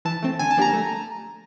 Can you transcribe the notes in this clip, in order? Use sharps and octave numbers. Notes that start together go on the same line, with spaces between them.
E3 A5
A3 C4
D3 G#5
A5
F3 A#3 D4 G4 A#5
A3